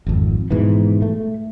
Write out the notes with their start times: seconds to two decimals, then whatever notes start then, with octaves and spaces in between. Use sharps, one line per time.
0.07 G#1 F2
0.51 G#2 B2 E3
1.02 A3